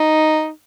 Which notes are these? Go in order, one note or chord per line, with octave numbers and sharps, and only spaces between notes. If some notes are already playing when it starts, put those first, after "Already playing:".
Already playing: D#4